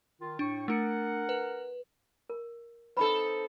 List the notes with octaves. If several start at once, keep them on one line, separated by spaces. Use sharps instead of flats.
D#3 F4
A2 D4 G5 C#6
A3 D4 A#4 F#5 C#7
B4
A#4
C4 D#4 A4 B4 B5